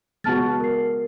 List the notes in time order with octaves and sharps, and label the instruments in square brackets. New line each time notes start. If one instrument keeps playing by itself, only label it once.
[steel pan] G#3 B3 F#4 [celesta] A5 F6 A6
[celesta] A#4 C7